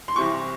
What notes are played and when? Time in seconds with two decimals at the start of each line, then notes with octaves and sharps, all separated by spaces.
0.08 C6
0.16 C2 C3 E3 C#6